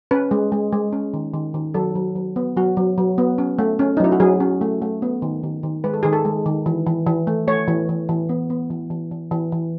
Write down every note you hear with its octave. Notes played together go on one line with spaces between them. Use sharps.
C#4 B4
G#3
G#3
G#3
C#4
D#3
D#3
D#3
F#3 A4
F#3
F#3
B3
F#3 F#4
F#3
F#3
B3
C#4
A3
C#4
D#4
F#3 E4
F#4
F#3 G#4
C#4
A3
A3
B3
D#3
D#3
D#3
G#3 B4
A4
D#3 G#4
A4
G#3
D#3
E3
E3
E3
A3
A3 C#5
E3
E3
E3
B3
B3
E3
E3
E3
E3
E3